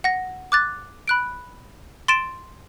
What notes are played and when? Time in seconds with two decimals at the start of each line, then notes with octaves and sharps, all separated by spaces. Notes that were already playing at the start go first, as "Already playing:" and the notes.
0.04 F#5 A#6
0.52 D6 F#6 A6
1.08 B5 F#6 D7
2.08 C6 A6 D7 E7